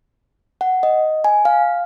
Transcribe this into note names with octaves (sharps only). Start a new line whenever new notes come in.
F#5
D#5
G#5
F5